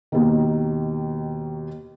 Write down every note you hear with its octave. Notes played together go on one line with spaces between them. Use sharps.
D#2 B2 D#3